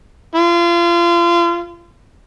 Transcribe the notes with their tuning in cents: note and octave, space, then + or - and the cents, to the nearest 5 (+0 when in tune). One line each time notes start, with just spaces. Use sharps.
F4 -30